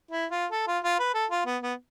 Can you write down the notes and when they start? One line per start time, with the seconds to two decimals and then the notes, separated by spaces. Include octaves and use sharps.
0.11 E4
0.31 F4
0.52 A4
0.68 F4
0.84 F4
0.99 B4
1.14 A4
1.31 F4
1.46 B3
1.63 B3